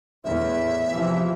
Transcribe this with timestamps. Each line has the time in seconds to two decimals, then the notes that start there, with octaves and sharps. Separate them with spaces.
0.24 E2 A2 E5
0.93 C3 E3 F3